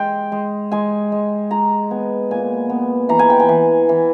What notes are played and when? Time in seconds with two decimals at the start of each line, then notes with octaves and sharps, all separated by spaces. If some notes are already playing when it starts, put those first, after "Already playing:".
Already playing: G#3 G5
0.32 G#3
0.72 G#3 G#5
1.12 G#3
1.51 G#3 A#5
1.91 B3 G#5
2.31 A#2 G#5
2.70 B3
3.09 E3 A#5
3.19 G#5
3.30 G5
3.40 G#5
3.49 E3
3.89 E3